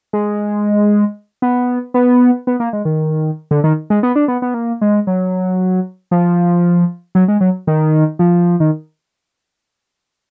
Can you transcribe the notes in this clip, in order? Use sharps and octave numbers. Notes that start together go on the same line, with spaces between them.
G#3
B3
B3
B3
A#3
G#3
D#3
D3
D#3
G#3
B3
D4
B3
B3
A#3
G#3
F#3
F3
F#3
G#3
F#3
D#3
F3
D#3